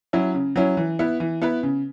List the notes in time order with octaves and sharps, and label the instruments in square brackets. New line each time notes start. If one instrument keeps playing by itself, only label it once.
[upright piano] F#3 C#4 E4
C#3
F#3 C#4 E4
E3
B3 E4 B4
E3
B3 E4 B4
C#3